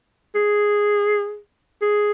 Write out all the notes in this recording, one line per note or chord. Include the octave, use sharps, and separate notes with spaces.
G#4
G#4